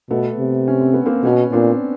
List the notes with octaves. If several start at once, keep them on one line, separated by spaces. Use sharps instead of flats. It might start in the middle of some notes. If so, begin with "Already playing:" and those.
B2 A3 B3
C3
C#4
C4
B3
A#3 C4
B2 B3 C#4
A#2 C4 D4